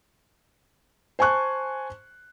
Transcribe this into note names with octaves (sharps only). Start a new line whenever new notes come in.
C5 G#5 A5 C#6 F#6